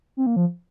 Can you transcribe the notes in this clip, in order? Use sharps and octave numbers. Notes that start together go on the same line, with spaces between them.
C4
A#3
F3